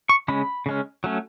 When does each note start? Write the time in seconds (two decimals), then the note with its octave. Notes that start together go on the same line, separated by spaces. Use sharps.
0.09 C#6
0.28 C#3 G#3 C#4 B5
0.66 C#3 G#3 C#4
1.04 F#3 A3 C#4